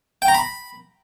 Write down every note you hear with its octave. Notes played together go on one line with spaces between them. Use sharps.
G5
A#5
B5